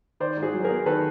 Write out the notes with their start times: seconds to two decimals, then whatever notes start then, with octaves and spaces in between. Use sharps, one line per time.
0.20 D#3 C5 D5
0.37 G#2
0.42 F#4 G#4
0.54 F#3
0.64 G#4 A#4
0.70 B3
0.86 D#3 A4 B4